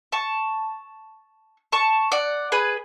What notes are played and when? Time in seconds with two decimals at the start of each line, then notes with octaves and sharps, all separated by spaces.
0.12 A5 C#6
1.72 A5 C#6
2.12 D5 F#5
2.52 G#4 B4